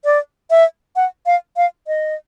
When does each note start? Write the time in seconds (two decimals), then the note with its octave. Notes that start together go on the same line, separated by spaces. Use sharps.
0.05 D5
0.50 E5
0.96 F#5
1.26 F5
1.57 F5
1.87 D#5